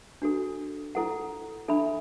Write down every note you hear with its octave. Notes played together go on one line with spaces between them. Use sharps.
D4 F#4 A4
E4 A4 F#5
D4 A4 E5 B5